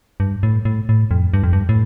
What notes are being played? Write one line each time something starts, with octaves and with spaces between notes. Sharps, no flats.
G2
A2
A2
A2
F2
G2
F2
G2
A2